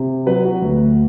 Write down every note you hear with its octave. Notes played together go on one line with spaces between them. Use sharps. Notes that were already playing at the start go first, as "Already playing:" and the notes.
Already playing: C3
F#3 B4
F#4
D2